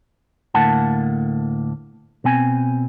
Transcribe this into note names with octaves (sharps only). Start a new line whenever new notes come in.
D2 A2 A#3 F#5 A5
B2 C4 G#5